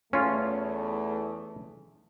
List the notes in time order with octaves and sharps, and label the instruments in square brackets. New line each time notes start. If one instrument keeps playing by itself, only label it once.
[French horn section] E2 A3 [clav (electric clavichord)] C#4 F4